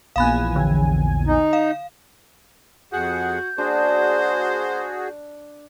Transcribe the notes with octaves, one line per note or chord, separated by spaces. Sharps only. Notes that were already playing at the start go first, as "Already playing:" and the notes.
A#1 E2 F5 G#5 B5 F#6
D3
D#4
F5
F2 F#4 G#4 F#5 G6
A#3 D4 F#4 G#4 C5